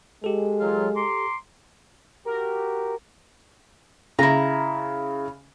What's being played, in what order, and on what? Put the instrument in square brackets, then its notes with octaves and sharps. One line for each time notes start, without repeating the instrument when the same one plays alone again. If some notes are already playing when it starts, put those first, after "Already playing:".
[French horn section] G#3 [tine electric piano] G4 A4
[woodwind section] E3 F#3 F4
A#5 C6 D6
[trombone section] F#4 G4 [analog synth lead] A#4
[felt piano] C#3 [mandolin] E4 A#5